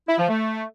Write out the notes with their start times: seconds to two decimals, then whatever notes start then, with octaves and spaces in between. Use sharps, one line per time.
0.08 E4
0.19 F3
0.29 A3